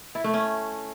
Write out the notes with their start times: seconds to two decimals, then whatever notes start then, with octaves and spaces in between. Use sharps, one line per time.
0.15 E4
0.24 A3
0.34 C#4